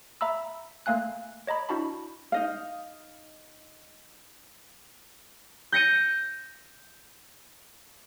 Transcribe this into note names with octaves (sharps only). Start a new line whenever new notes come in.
E5 A#5 B5 E6
A3 A#3 F5 G#5 F#6
C#5 D#5 A#5 B5
D4 E4 F#4 A5 B5
D#4 D#5 F5
G6 A#6 C#7 D#7